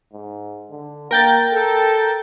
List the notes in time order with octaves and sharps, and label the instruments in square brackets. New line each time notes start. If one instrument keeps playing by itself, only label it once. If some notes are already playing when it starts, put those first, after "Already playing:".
[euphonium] G#2
D3
[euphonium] A#3 [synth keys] A#4 G5 A6
[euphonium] A4